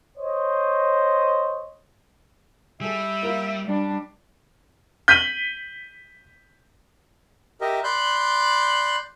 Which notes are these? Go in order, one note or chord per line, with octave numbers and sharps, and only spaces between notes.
C5 C#5 D#5
G3 G#4 A4 E5
A#3 F4 A#4
G3 D4
G6 B6 D#7 F#7
G4 A#4 D#5 E5
D5 B5 C6 F#6 G6